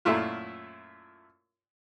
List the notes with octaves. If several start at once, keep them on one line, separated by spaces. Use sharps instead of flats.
F#2 A#2 A3 E4 F4